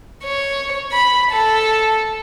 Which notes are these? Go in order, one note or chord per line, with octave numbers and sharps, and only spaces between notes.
C#5
B5
A4